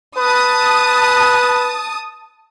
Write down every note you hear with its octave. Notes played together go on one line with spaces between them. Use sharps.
B4 A5 D#6